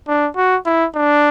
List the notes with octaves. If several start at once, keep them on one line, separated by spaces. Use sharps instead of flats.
D4
F#4
E4
D4